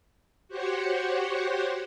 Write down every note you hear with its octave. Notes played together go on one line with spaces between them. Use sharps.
F#4 G4 C5 C#5 F#5